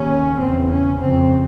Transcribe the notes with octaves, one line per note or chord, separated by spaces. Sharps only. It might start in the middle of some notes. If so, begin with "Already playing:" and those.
Already playing: D#2 C#3 C#4
E2 C#3 C4
C#4
F2 C#3 C4